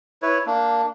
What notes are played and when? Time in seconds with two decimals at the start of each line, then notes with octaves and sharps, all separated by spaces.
0.22 E4 B4 C#5
0.46 A#3 D4